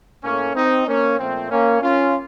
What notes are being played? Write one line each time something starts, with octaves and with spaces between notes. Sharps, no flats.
A2 A3 A#3 C#4
C4 D#4
A#3 C#4
A#2 F3 A3 C4
A#3 C#4
C#4 F4